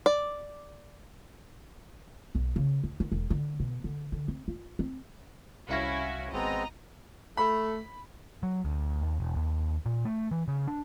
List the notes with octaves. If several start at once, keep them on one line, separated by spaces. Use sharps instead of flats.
D5
B1
C#3
D#2
D#3
E1
D3
B2
D3
D3
C4
F4
C4
C2 C#4 E4 F#4 F5 A#6
G#1 G#3 B3 C4 D#5 A#5 A#6
A3 B5
F#3
D2
D#2
E1
D#2
A#2
A3
E3
C#3
D4